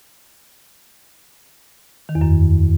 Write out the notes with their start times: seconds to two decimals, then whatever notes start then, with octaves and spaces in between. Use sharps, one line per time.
2.09 D#3
2.15 E2
2.21 F#2